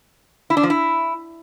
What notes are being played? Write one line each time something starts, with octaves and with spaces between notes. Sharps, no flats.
E4
D4
F3
E4